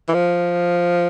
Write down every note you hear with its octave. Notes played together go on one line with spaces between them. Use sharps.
E3
F3